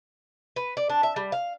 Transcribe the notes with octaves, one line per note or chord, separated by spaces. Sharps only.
B4
D5
D4
E5
G3
F5